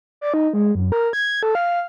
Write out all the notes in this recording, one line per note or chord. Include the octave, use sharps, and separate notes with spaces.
D5
D#4
G#3
F#2
A#4
G#6
A4
F5